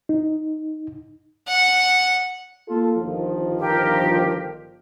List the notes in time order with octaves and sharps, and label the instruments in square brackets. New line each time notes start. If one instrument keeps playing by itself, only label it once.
[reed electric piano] D#4
[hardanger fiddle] F#5
[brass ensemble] A#3 F4 A4
G1 D#3 F3
[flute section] G4 A#4